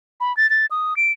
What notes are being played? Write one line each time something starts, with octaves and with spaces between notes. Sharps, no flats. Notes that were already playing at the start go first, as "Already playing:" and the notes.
B5
A6
A6
D#6
D7